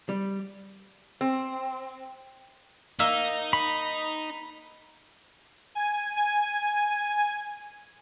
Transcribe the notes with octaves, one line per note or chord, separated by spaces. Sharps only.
G3
C4
A#3 D#4 E5 F5
B5
G#5
G#5